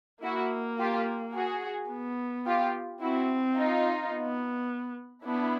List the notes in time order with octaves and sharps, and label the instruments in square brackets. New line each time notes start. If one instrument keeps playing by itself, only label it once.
[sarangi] A#3 [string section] E4 F#4
[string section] F4 G4
F#4 G#4
[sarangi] B3
[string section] F4 G4
[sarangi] C4 [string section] E4 F#4
[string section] D#4 F4
[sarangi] B3
[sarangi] B3 [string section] D4 E4